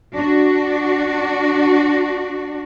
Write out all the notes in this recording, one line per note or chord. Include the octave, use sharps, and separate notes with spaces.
D4 F#4